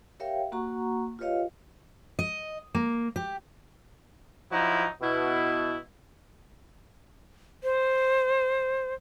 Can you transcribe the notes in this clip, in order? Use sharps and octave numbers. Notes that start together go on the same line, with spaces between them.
G4 A#4 C#5 E5 F5 G5
A#3 F#4 F#5 A#5 C#6
F4 G4 B4 C#5 D#5 F5
D#5
A#3
G4
F3 F#3 D#4 E4
B2 E4
C5